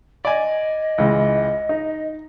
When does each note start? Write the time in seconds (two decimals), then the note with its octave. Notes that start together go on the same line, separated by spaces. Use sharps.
0.25 D5 D#5 G#5
0.98 C#2 E3 G#3
1.69 D#4